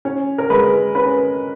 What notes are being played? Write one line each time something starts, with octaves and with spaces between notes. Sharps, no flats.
C#4
A#4
G#3 B4
C#4 B4